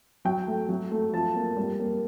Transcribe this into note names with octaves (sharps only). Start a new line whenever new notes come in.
F#3 G5
A3
F#3
A3
F3 A5
A#3
G3
A#3